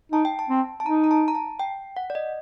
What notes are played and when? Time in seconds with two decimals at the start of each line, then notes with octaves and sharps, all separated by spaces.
0.12 D#4 A5
0.25 G5
0.39 A5
0.49 C4
0.80 A5
0.86 D#4 A#5
1.04 A#5
1.11 A5
1.28 A#5
1.35 A5
1.59 G5
1.97 F#5
2.10 D5
2.15 D#5